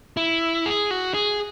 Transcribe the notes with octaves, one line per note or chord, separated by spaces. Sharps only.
E4
G#4
F#4
G#4